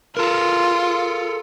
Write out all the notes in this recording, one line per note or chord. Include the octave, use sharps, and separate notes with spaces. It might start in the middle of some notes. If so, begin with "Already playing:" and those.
F4 A4 A#4